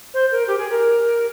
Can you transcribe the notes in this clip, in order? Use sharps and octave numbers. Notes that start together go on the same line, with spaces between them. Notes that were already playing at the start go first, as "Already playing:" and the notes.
C5
A#4
G4
G#4
A#4